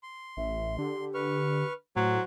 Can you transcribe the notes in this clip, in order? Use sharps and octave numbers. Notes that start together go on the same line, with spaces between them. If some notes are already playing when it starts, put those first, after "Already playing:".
C6
A1 E5
D3 G4
B4 C#6 F6
A2 F#3 C5